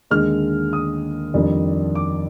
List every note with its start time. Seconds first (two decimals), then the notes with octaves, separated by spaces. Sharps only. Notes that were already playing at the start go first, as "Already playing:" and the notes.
0.10 D#2 D3 G#3 F6
0.73 D#6
1.34 F2 D#3 G3 D4
1.95 D6